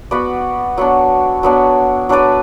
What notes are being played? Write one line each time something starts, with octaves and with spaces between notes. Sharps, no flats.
B3 F#4 B4 D5
F#3 B3 D4
F#3 B3 D4
F#3 D4 B4 D5